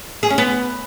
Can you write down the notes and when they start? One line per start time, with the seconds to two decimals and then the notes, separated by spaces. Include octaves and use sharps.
0.23 G#4
0.30 C#4
0.38 B3